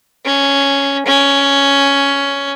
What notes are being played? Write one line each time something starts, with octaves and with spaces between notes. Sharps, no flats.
C#4
C#4